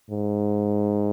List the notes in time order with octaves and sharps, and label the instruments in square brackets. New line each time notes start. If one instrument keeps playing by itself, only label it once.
[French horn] G#2